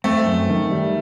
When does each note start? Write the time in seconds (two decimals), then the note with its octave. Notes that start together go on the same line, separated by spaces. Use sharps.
0.04 A3 C4
0.26 F#2
0.49 D#3
0.71 G3